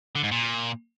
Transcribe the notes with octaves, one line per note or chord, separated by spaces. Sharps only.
D3
G#2
A#2